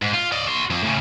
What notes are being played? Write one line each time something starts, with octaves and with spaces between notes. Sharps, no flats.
G#2
F4
D5 D#5
F#4 C6
F2
A2 C#3